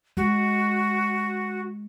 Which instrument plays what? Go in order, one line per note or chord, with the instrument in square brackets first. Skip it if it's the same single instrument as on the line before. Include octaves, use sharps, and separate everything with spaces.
[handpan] G#3 [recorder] F#4